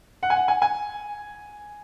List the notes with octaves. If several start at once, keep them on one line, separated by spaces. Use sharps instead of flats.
F#5
G#5
F#5
G#5
G#5